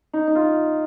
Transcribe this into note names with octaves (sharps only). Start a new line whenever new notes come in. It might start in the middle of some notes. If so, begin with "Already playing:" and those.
D#4
D#4
F4